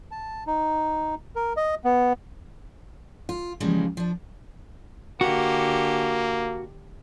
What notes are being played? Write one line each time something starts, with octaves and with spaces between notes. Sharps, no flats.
A5
D#4
A#4
D#5
B3
F4
C#3 E3 F3 G3 G#3 A#3
F3 D4
D3 A#3 F#4 G4